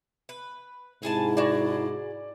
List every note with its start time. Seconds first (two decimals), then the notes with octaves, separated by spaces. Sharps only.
0.29 B4
1.03 G#2 C3 E4 G#4 G#5 A5
1.37 F#4 G#4 D5